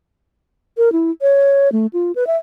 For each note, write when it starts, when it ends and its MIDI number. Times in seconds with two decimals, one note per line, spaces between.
0.77 0.92 70
0.92 1.11 64
1.22 1.71 73
1.72 1.87 57
1.93 2.12 65
2.15 2.27 71
2.27 2.37 76